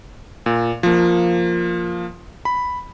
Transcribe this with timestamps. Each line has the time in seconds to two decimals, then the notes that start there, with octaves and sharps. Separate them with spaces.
0.46 A#2
0.83 F3 A#3
2.45 B5